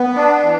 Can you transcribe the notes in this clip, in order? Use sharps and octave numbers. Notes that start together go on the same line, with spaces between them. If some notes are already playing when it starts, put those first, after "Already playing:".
Already playing: B3
D4
E3